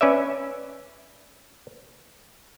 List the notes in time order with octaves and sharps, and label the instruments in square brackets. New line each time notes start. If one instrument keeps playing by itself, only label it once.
[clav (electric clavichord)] C#4 B4 D5 E5